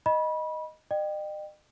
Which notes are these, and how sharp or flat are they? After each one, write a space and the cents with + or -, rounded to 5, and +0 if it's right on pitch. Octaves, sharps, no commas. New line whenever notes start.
D#5 +0 B5 -25
D#5 -45 G5 +0